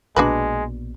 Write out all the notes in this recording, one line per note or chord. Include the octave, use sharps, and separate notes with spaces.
A#1 B2 G#3 D4 F#4 B4